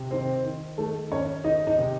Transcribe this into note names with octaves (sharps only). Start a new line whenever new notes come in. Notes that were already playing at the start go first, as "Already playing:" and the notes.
Already playing: C3
D#3 C4 C5
D#3
D#3 A3 A4
D#3 C#4 C#5
D#3 D#4 D#5
D#4 D#5
C3